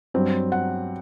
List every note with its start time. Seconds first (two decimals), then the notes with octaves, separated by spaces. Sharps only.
0.14 G2 F#3 C4
0.52 F#5